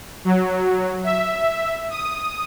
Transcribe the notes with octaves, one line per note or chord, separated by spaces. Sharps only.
F#3
E5
D#6